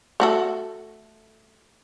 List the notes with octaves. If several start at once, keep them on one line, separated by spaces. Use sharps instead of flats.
A3 F#4 A4